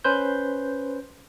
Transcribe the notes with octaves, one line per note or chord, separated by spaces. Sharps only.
C#4 B4 C5 G6